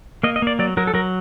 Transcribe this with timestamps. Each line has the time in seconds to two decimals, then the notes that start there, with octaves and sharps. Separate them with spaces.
0.23 A#3 D#5
0.36 D#5
0.42 A#3 D5
0.59 F#3 D5
0.77 F#3 A#4
0.87 A4
0.94 F#3 A#4